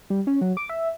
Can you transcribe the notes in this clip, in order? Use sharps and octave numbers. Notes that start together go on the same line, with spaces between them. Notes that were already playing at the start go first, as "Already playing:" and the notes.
G3
C#4
F#3
D6
E5